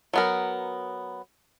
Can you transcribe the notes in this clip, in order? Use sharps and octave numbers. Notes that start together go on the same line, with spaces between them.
F#3 B3 A#4